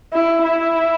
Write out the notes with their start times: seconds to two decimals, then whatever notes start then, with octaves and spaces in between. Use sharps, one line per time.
0.13 E4
0.43 E4